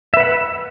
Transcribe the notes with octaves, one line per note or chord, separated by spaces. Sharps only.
B4 E5 F#5 B5